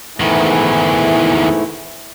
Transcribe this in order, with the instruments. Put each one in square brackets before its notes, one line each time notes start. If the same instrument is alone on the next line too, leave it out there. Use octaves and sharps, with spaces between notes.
[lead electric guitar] E2 D#3 [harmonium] G#2 A3 E4 [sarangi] E3